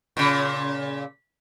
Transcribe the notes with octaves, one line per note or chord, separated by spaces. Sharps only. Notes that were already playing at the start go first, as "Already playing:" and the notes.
A#2 C#3